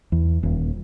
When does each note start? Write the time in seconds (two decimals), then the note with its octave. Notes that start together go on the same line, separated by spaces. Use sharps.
0.12 E2
0.43 D#1